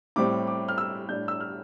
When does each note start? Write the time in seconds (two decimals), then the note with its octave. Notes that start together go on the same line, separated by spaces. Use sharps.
0.16 A2 G3 C4 D6
0.47 D6
0.68 F6
0.78 E6
1.09 A2 G3 D4 G6
1.28 E6
1.40 F6